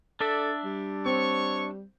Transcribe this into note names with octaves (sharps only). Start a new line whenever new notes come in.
D4 A4 D5 E5
G3
C4 C#5 C#6